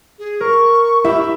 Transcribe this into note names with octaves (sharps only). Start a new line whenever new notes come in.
G#4
A#4 C#6
E4 G4 A#4 E5